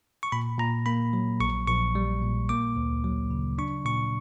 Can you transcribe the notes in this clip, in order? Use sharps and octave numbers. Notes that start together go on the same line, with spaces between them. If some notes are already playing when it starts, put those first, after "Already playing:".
C#6
A#2 B5
A#2 A#5
A#3 B5
F#3
A#1 C#6
A#1 C#6
G3
A#2
A#3 D6
D2
F#3
C#3
D4 C#6
A#2 C#6